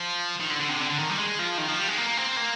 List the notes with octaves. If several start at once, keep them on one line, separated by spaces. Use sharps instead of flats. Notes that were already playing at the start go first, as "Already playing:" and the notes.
Already playing: F3
D#3
D3
D3
C3
D3
D3
D#3
G3
G#3
F3
D#3
F3
G3
G#3
A#3
C4
A#3